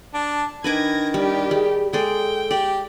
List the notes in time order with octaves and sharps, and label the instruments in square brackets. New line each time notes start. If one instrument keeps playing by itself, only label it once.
[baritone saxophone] D4 [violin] A5
[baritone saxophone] D#3 [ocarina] D4 [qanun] B4 G#5 D6 [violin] G#6 A#6
[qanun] G3 [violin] G4 D5
[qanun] G3 [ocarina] G#4
[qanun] G#3 D5 [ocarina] A4 [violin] G5
[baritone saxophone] G4 [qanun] D5